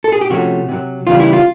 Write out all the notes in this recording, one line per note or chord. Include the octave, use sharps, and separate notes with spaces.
A4
G#4
G4
C3 F3 A3 C#4 F#4
C3 D#3 F#3
E2 C#3 E3 G3 F4
E4
F4